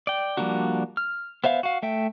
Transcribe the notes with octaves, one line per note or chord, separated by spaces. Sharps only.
D5 G5
F3 G3 A#3 D4 F#4
F6
B3 C5 E5 F5
F#4 F5
A3 E5 G5